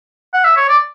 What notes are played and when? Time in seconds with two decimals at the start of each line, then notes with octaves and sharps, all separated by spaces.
0.34 F#5
0.44 E5
0.57 C#5
0.69 D5